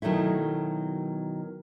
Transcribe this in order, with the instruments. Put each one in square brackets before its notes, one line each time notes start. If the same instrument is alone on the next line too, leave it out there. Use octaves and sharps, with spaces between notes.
[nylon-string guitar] B2 D#3 F#3 A3 E4